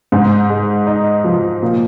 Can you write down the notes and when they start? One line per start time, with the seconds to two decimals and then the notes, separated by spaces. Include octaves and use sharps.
0.12 G#2
0.50 G#3
0.87 D#4
1.24 F3
1.62 A#2